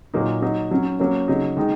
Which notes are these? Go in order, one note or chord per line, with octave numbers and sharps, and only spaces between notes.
A#2 F#3 A#3 D#4
F#3 D#4
F#3 C#4
F#3 A#3 C#4
C#3 F#3 D#4
D#3 G#3 D#4